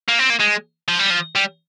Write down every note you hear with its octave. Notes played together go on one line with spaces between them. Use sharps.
A#3
C4
A#3
G#3
F3
G3
F3
G3